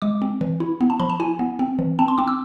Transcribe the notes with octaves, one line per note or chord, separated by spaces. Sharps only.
G#3 D6
C4
E3
E4
B3
A5
F3 B5
A5
E4 G#5
B3
C4
E3
C4 A5
C6
C4 D6
E6